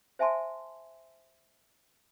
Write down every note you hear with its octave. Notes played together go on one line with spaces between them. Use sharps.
C5 E5 G#5 A5 C6